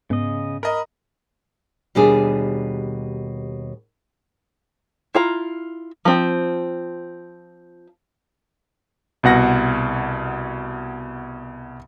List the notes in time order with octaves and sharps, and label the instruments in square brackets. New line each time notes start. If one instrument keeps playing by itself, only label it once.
[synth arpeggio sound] G#2 B3 [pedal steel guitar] C#3 D#5
[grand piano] A#4 D#5 [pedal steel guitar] B5
[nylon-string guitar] D#2 B2 G3 D4 G#4
[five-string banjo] E4 F4 A#5
F3 C4
[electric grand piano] C2 B2 F#5 A#6